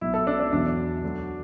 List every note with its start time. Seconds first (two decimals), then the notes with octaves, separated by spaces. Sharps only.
0.01 B1 B2 F#3 E4
0.14 A4
0.27 D4
0.40 D4
0.53 E2 B2 F#3 D4
1.03 D2 D3 F#3